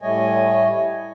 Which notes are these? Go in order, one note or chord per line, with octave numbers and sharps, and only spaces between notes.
A2 G3 A3 C#5 D#5 G#5